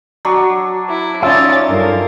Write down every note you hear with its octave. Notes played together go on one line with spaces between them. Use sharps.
F#3 D4 C#6
E4
C#4 D#4 F4 D5 E5 D6 A6
G2 D3 F4 A#4